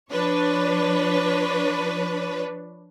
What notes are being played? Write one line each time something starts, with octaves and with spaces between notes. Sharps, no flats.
F3 D4 B4 C#5